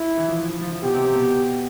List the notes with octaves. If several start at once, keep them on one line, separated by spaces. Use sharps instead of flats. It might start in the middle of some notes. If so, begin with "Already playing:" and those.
Already playing: E4
E3
F3
F3
F3
F3
F3
B2 B3 G4
C3 C4
C3 C4
B2 B3